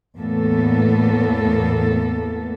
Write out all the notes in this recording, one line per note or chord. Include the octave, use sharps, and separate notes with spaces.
E2 A2 A#3 B3 A4